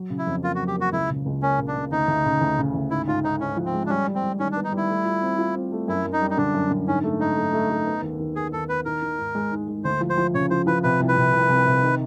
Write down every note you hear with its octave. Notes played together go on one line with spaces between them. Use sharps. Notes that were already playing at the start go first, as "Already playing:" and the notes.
Already playing: F#3
C#3
E4
F2
A#3 F4
F#4
F#3
G4
A#3 F#4
C#2 E4
C#3
C#2
A#3 C#4
C#3
D4
C#3
D2 D#4
D2
C#3
D2
C#3
D2
G#2 E4
G#2 F4
G#2 D#4
G#2 C#4
F3
C4
G#3
D4
G3 C#4
G3
C4
G3
D#3 C#4
D4
B3
D#4
G3 E4
A3
F4
C4
F4
C4
A3
F#2 E4
F#2
D#4
G3
D#4
D3 D4
F#2
D3
G#2 C#4
A3
G#2 D#4
A3
A3
A3
B3
D#2
D#2
B3 G#4
D#2 A4
B3 B4
D#3 A#4
D#3
G#2
G#3
G#2
G#3
D2 C5
F3
C5
F3
C#3 C#5
F3 C5
F3 B4
C3 B4
C2
B4
C3
C2
C2
C3
D#3